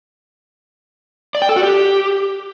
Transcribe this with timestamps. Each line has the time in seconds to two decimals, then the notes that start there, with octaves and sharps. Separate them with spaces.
1.35 D5
1.42 G5
1.49 A4
1.56 F#4
1.63 G4